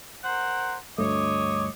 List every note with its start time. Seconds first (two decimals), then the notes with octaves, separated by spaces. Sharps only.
0.24 A#4 C5 F#5
0.98 D2 G2 A3 C#5 D#5 D6